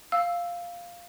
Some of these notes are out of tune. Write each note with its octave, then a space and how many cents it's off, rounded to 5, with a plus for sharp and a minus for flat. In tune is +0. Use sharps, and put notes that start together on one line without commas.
F5 +0 E6 +0